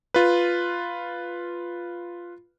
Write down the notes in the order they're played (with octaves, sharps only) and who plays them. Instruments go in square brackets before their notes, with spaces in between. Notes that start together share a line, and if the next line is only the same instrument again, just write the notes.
[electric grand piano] F4 B4